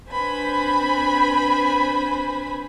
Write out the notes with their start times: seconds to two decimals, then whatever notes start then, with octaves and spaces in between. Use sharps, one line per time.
0.11 C4 D4 B4 C5 G#5 B5